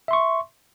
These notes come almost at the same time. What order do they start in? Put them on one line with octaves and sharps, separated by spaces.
E5 C6 C#6